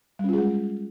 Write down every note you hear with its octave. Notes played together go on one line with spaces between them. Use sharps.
G3 G#3 C#4 F4 G#4